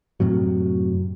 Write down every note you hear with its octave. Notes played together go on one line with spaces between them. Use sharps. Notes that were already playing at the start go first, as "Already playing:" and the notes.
F#2 A2 C3 F#3